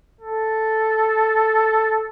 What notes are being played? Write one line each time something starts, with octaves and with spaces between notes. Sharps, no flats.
A4